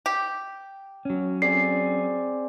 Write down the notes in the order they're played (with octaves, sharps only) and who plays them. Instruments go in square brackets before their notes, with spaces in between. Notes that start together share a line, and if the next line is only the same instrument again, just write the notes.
[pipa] G4
[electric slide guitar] F#3 C#4
[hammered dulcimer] C4 G#4 D5 [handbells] C7